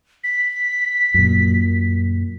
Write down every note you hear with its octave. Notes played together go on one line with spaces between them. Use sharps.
B6
F#2 A#2